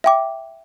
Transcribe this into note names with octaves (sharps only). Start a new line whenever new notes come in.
E5 G5 D6